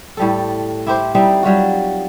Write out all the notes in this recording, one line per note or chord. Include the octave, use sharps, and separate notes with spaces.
A2 G3 A4
E4 G4 C5
G3 C4 D#4 E4
F#3 G3 F4 F#4